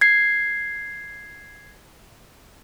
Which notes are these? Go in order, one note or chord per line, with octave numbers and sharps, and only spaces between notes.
G#6 C7